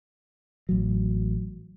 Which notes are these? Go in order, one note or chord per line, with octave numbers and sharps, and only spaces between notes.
A1 F#3